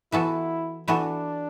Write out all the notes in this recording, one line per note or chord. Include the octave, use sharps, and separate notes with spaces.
E3 B3 E4 F#4 A4
E3 B3 D4 F#4 A4